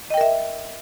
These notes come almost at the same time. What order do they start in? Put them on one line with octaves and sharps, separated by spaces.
D#5 G5 A#4 E5